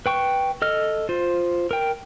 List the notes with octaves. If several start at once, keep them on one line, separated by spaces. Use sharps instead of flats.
B4 G5 C#6
A4 D#5 F6
F4 C5
A#4 G5